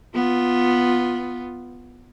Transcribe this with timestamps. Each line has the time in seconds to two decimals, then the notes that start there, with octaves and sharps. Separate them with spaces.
0.15 B3 F4